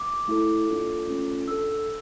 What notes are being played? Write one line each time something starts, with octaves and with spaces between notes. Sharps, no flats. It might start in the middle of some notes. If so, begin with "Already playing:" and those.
Already playing: D6
A3 E4 A4
A#3 D4 F4 A4
A3 C#4 F4 A4
D4 A4 E6